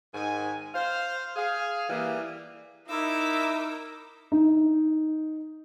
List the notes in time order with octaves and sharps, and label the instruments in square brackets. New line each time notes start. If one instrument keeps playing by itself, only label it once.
[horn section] G#2 D#3 G#5
C5 F5
G#4 F5
E3 G3 A#3 G4
[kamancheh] D#4 [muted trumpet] E4 [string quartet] A#4 D6 E6
[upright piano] D#4